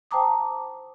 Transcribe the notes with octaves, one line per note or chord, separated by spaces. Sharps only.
C5 G5 A5 A#5 D6 D#6